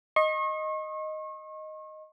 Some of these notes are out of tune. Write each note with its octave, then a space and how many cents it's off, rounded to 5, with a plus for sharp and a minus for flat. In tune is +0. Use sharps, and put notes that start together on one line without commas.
D#5 +0 C#6 -40